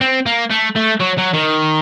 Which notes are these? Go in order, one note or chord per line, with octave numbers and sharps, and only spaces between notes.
C4
A#3
A3
A3
F#3
F#3
D#3